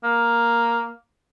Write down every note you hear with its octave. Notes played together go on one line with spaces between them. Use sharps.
A#3